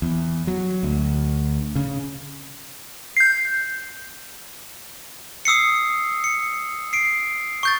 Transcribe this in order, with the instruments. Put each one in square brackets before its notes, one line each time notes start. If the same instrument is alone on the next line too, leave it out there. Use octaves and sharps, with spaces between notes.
[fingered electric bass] E2
F#3
D2
C#3
[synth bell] G6 C7
[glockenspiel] D#6 E6 C7 C#7
C#7
C7 D7
C#6 G6 A6